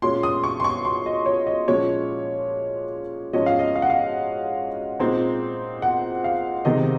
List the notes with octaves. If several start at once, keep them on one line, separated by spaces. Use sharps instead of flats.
A#2 G#3 C#4 C6
D#6
C#6
C6
C#6
C6
D#5
C#5
D#5
A#2 F3 G#3 C#4 C#5
G#2 F3 G#3 C#4 D#5
F5
D#5
F5
F#5
F5
A#2 G#3 C4 D#4
F#5
F5
C3 D#3 G#3 C4 D#4 D#5